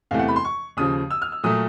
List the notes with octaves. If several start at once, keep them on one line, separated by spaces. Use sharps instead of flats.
E2 C3 E3 A3 F5
F#5
B5
C6
C#6
D#2 C#3 F3 D#6
E6
F6
E6
A#2 F#3 A3 D#6